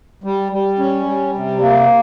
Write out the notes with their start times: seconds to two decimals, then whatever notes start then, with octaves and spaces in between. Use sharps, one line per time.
0.24 G3
0.52 G3
0.79 C#4
1.06 G3
1.34 C3
1.61 A#3